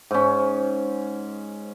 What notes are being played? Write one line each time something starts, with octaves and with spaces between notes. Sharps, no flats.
G#2 C#4